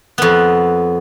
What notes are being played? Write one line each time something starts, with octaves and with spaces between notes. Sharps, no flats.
F2 B3